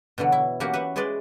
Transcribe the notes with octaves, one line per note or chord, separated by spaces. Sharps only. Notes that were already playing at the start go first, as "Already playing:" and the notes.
B2 D3 E3 F#3
E4
E3 A#3 C#4 F#4 G4
B4 E5 F#5
E3 G#3 G#4 B4 D5 C6